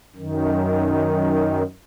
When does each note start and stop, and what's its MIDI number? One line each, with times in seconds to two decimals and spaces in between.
0.16 1.63 42
0.16 1.63 51